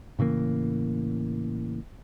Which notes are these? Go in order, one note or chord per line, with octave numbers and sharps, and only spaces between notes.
A2 C#3 E3 A#3